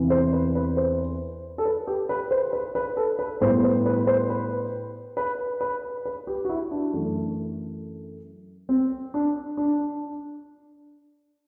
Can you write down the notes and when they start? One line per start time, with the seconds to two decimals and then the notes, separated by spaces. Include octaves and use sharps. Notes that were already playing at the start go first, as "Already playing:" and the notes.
Already playing: E2 C3 E3
0.10 C5
0.33 B4
0.55 B4
0.77 C5
1.58 A4
1.65 B4
1.87 G4
2.09 B4
2.31 C5
2.53 B4
2.75 B4
2.97 A4
3.19 B4
3.41 A2 G3 B3 C5
3.63 C5
3.86 B4
3.96 B4
4.07 C5
4.30 B4
5.17 B4
5.61 B4
6.05 B4
6.27 G4
6.45 F#4
6.49 E4
6.71 D4
6.93 F#2 E3 A3
8.69 C4
9.14 D4
9.57 D4